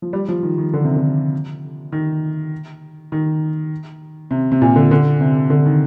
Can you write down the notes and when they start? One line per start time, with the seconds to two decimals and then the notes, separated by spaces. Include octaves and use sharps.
0.02 F3
0.13 G3
0.29 F3
0.43 D#3
0.58 D#3
0.73 D3
0.84 C3
0.96 D3
1.92 D#3
3.12 D#3
4.31 C3
4.52 C3
4.62 A#2
4.76 D3
4.91 D3
5.21 C3
5.50 D3
5.66 D#3